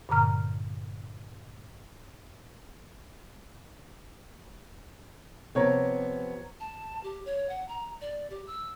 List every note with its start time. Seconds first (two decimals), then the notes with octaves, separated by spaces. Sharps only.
0.09 G2 A#2 D3 A#5 F6
5.55 C3 F3 B3 C5 C#5 A#5
6.60 A5
7.03 G4
7.26 C#5
7.49 F#5
7.69 A#5
8.01 D5
8.30 G4
8.47 E6